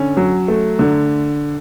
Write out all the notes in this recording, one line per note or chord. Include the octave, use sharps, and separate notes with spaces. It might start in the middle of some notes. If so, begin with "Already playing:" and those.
Already playing: D3 C#4
F#3
A3
D3